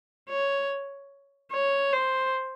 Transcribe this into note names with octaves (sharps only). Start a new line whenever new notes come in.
C#5
C#5
C5